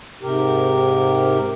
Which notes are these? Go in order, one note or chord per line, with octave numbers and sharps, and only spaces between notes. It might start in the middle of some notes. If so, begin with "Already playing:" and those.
G#2 C3 G4 A#4